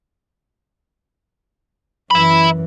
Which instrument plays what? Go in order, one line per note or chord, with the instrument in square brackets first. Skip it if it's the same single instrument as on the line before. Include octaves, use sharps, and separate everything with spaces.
[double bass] F#2 E3 [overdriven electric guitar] E5 B5